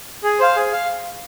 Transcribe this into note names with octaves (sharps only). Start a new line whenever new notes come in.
G#4
C5 F5
G#4
F5